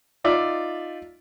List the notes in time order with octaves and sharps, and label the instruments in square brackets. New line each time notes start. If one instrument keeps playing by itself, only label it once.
[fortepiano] D#4 F4 D5 E5